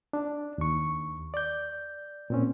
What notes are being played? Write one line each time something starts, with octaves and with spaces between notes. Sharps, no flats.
D4
D#2 C#6
D5 G6
A#2 C4 C#4